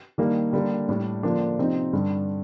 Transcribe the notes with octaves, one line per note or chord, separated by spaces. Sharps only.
D#3 G3 A#3 D4
D3 G3 A#3
A2 G3 D4
D3 F3 A#3 D4
C3 F3 C4 D#4
G2 D3 G3